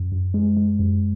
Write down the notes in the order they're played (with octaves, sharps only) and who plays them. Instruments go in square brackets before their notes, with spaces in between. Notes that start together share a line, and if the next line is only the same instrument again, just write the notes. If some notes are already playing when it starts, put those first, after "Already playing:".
Already playing: [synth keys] F#2
F#2
G#3
G#3
F#2